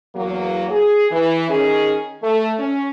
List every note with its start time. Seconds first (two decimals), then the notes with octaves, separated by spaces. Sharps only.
0.15 E2 F#3 A#3
0.71 G#4
1.11 E3
1.49 D#3 C#4 G#4
2.23 A3
2.58 C#4